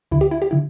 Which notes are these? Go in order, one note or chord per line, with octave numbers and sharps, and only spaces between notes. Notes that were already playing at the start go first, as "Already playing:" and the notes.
D2 D3 E4
G4
E4
G4
D3 E4